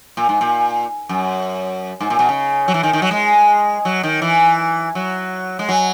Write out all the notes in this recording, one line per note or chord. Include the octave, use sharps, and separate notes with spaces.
A#2
G#2
A#2
F#2
G#2
A#2
B2
C#3
F#3
E3
D#3
D#3
F#3
G#3
F#3
D#3
E3
F#3
G#3
F#3